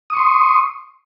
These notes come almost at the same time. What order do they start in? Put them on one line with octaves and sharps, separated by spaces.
D#6 C#6 C6